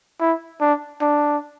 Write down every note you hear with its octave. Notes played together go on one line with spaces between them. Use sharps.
E4
D4
D4